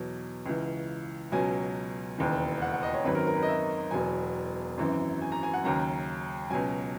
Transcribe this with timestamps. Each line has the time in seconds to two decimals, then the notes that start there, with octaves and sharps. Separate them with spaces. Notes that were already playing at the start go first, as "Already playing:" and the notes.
Already playing: E2 B2 F#3
0.46 C#2 C#3 E3
1.32 C#2 B2 F#3 G#5
2.18 E1 D#2 C#3 E3
2.62 F#5
2.72 F#5
2.83 D#5
2.94 C#5
3.04 G#1 F#2 D#3 F#3 B4
3.15 A#4
3.27 A#4
3.37 B4
3.43 D#5
3.48 E5
3.91 E1 E2 B2 F#3 G#5
4.77 G#1 F#2 E3
5.22 G#5
5.32 A#5
5.43 G#5
5.54 F#5
5.64 D#2 C#3 F#3 A#5
6.50 C#2 B2 F#3 G#5